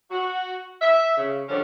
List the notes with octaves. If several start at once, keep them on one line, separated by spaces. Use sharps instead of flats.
F#4
E5
C#3
D3 D#3 F3 G3 C#4 D4